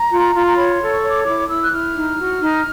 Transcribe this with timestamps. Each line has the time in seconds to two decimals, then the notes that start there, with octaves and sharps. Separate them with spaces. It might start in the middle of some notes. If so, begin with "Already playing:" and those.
Already playing: A#5
0.10 F4
0.34 F4
0.47 A#5
0.56 C#5 B5
0.69 B5
0.74 C6
0.80 A4
0.91 C#6
1.03 C#5
1.08 D6
1.25 E4 D6
1.48 E4 E6
1.63 F#6
1.72 E4 F6
1.95 D#4
2.17 F#4
2.41 D#4